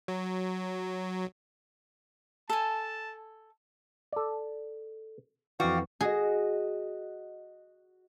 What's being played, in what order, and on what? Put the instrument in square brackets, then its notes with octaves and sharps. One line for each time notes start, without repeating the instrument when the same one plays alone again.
[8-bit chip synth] F#3
[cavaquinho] A4 G#5 [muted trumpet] A5
[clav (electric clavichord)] A4 D5
[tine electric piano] F2 E3 [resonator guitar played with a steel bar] F#4 [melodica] D5 F5 G5
[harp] F#4 D#5 [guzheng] G#4